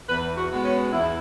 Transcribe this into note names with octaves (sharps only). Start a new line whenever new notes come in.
E2 B4
F#4
B2 G#3 B3
C#4
E2 E4